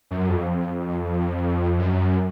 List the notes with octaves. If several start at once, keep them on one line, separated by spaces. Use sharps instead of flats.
F#2
F2
F#2